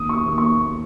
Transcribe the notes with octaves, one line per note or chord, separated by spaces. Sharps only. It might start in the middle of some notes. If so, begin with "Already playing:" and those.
Already playing: D#2 D#6
C#6
D#6
D#2
C#6